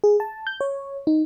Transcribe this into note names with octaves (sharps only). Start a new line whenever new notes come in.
G#4
A5
G6
C#5
D#4